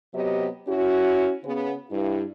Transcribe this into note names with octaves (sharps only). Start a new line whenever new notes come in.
C3 F#3 B3 G4 D#5
C#4 E4 F#4
C#3 B3
G2 E4